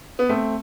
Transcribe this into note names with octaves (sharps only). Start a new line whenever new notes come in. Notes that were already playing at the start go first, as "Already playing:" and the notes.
B3
A3 C4